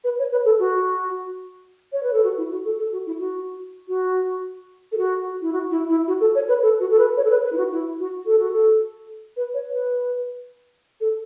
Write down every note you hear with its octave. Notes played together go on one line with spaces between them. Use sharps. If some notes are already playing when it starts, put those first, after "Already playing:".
B4
C#5
B4
A4
F#4
C#5
B4
A4
F#4
E4
F#4
A4
A4
F#4
E4
F#4
F#4
A4
F#4
E4
F#4
E4
E4
F#4
A4
C#5
B4
A4
F#4
A4
B4
C#5
A4
B4
B4
E4
F#4
E4
F#4
A4
F#4
A4
B4
C#5
B4
A4